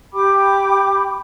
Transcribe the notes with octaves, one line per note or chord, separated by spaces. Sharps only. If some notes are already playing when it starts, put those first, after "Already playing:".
G4 G5 B5 D6